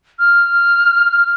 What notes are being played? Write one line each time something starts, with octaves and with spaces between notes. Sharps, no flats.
F6